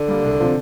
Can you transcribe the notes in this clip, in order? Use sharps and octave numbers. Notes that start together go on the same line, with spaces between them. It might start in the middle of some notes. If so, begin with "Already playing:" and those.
Already playing: D3
G3 A#3
C2
C3 F3 C4 F4